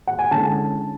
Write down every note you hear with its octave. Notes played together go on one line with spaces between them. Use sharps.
F#5
G#5
D3 G#3 C#4 E4 A5